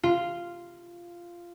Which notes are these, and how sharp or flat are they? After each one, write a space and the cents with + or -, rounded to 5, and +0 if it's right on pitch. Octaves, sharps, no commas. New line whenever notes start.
F4 -10